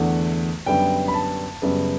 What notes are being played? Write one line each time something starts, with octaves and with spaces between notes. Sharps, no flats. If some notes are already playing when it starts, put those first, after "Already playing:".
Already playing: E2 D3 A3 F#5
F#2 D3 G3 B3 G5
B5
A5
F#2 C#3 G3 B3